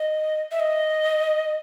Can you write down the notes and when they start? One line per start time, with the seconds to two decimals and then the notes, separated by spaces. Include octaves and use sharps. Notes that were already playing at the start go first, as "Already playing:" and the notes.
Already playing: D#5
0.51 E5
0.60 D#5